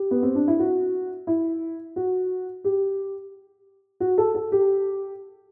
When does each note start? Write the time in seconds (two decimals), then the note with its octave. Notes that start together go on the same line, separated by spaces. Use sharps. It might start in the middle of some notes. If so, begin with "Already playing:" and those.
Already playing: G4
0.11 B3
0.23 C4
0.35 D4
0.48 E4
0.59 F#4
1.27 E4
1.96 F#4
2.64 G4
4.00 F#4
4.18 A4
4.35 A4
4.52 G4